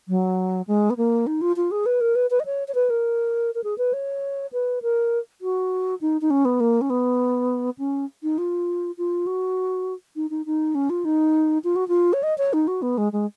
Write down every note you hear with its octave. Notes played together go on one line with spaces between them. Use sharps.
F#3
G#3
B3
A#3
D#4
F4
F4
G#4
B4
A#4
B4
B4
D#5
C#5
C#5
B4
A#4
A#4
G#4
B4
C#5
B4
A#4
F#4
D#4
D#4
C#4
B3
A#3
C#4
B3
C#4
D#4
F4
F4
F#4
D#4
D#4
D#4
C#4
F4
D#4
F4
F#4
F4
C#5
D#5
C#5
D#4
F#4
B3
G#3
G#3